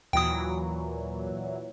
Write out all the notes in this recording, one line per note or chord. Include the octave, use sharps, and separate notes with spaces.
D#2 A#2 E3 F#3 G5 D#6